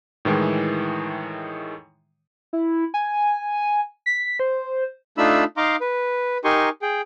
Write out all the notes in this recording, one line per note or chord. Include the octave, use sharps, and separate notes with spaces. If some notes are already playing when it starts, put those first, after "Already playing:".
A2 D#3 E3 G#3
E4
G#5
B6
C5
A3 D4 D#4 F4 B5 E6
D#4 F5 A#5 C6 D6
B4
D#4 G4 A#4 G#5 C6 C#6
G#4 G5